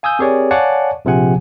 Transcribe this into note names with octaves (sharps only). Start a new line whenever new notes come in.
F5 G#5 D#6 E6 G6
C4 G4 G#4 A#4 C#5 D5
C#5 D5 F5 F#5 G#5 A5
A#1 C3 F3 G#4 F#5 G#5